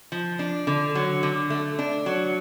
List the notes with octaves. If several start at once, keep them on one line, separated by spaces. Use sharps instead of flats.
F3
D4
D3
F#3
D3
A3
D4
F#3